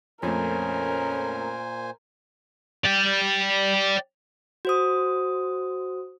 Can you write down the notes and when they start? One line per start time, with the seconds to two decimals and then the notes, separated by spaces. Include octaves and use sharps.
0.23 F2 A#2 A3 C#4 A#4 C5 G#5
2.84 D5 G5
4.65 F#4 C5 D#6